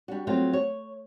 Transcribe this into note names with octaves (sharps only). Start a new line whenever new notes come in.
G3 D4 F#4
F#3 G3 A3 C4 F4
C#5